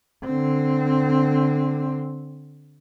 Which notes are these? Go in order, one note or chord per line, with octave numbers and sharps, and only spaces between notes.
D3 C4